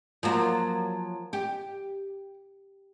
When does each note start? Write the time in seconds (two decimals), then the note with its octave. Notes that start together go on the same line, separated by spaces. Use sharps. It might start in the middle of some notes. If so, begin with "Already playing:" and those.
0.23 F3 F#3 A#3
1.33 G4